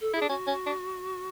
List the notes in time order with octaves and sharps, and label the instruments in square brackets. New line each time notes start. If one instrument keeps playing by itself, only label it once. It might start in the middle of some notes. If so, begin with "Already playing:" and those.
[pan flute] A4
[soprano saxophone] E4 [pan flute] G#4
[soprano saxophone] D4
[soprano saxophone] C#4 [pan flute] F#4
[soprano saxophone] C#4
D4